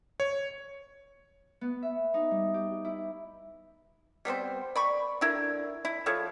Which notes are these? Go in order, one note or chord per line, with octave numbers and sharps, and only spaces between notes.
C#5
B3
E5
D#4
G3
G4
E4
G3 B3 C4 C5
D5 B5 C#6
D3 E4 A#4
E4
F3 A4 C#5